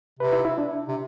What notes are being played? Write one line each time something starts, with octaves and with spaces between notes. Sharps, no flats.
C3 B4
E4
E4
D4
C3